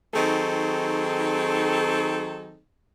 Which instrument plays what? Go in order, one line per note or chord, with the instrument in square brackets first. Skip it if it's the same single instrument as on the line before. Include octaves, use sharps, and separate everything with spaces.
[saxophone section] D#3 F#3 C4 D#4 G#4 A4